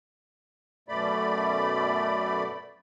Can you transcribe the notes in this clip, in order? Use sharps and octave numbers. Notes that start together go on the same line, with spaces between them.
F#2 B2 A3 D5 B5